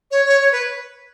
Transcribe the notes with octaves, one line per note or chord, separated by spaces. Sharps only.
C#5
C#5
C#5
B4